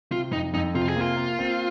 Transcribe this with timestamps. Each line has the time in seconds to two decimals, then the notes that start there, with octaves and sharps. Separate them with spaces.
0.12 C3 F4
0.33 F2 D#4
0.54 F2 D#4
0.75 C3 F4
0.88 G#4
0.96 A#3 F4
1.17 A#3
1.39 C4